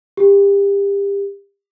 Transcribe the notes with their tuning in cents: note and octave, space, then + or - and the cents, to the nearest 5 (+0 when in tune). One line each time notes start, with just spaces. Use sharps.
G4 +30